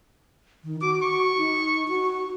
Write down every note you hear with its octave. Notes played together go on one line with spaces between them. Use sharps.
D#3
F#4 D6
C#6
D#4
F#4